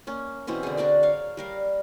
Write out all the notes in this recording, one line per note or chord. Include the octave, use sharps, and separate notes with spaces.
A#3 C#4
B2 E3 C4 C#4
D3 G#4
D4 F#4 A#4 D5
C#5 F5
G3 A#4 F5